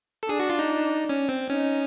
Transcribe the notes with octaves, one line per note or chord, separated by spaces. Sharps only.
A4
D4 G#4
F#4
F4
D#4
C#4
C4
C#4 D#4